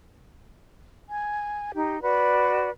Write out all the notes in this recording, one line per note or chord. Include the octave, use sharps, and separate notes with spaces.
G#5
D#4 G4
F#4 B4 D5